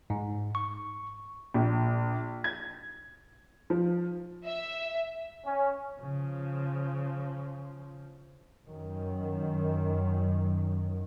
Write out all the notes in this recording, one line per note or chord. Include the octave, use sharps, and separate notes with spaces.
G#2
C#6
A#1
G#6
F3
E5
C#4
C#3 F3
F#2 D#3